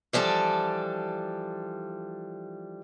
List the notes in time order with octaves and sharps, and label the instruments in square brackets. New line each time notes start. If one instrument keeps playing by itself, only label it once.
[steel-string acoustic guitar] E3 F3 G3 D4 A4